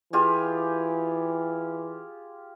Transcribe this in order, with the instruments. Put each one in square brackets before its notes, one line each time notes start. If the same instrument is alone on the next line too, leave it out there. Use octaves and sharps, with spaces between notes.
[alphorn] E3 [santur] F4 G4 G#4